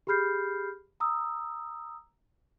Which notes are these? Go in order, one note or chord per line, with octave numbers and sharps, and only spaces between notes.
G4 G#4 B5 F6 G6 C7
A#5 D#6 E6